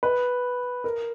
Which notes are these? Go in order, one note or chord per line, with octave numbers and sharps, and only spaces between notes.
B4
A#4